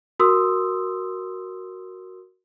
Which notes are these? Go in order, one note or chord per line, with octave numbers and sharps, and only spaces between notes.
F#4 A#4 C6 D#6 E6